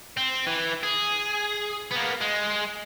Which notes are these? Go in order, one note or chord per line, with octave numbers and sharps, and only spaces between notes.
C4
E3
G#4
A#3 B3
G#3